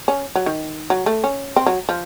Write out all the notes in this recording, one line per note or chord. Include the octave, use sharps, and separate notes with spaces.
C#4
F#3
D#3
F#3
A3
C#4
C4
F#3
F3